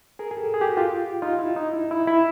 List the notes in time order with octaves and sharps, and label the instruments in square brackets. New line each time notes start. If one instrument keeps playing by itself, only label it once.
[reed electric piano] G#4 A#4
G#4
G4 A4
G#4
G4
F#4
F4 G4
D#4 F4
E4
D#4
E4
E4
E4